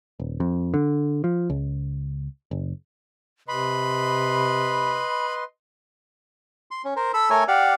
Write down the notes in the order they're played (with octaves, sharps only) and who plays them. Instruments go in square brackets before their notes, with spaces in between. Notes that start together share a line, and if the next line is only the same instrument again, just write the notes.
[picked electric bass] D#1
F2
D3
F3
C#2
F#1
[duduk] C3 [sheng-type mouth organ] B4 D#5 C6 [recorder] B5
[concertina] C6
C#4
A#4 C5
A4 B5 E6
A3 A4 A#4 C#5 G#5
G4 D5 F5 F#5